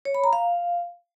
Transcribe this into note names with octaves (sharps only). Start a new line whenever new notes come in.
C#5
B5
A#5
F5